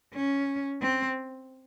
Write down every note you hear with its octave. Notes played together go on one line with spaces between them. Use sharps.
C#4
C4